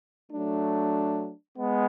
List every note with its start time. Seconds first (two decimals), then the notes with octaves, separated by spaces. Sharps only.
0.30 F#3 A3 D4
1.57 G#3 B3